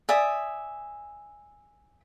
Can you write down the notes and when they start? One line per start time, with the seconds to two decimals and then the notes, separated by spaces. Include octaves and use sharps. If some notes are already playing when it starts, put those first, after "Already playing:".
0.09 D5 E5 G#5 D#6